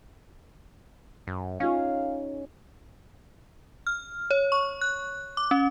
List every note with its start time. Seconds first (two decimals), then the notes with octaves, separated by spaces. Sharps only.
1.27 F#2
1.60 C#4 D#4 F4 G#4 F5
3.87 F6
4.31 C#5
4.52 C#6
4.81 F#6
5.37 D6
5.51 C#4